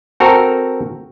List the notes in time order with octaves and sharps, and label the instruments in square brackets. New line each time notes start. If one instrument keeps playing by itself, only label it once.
[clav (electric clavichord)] C4 F#4 A4 A#4 A#5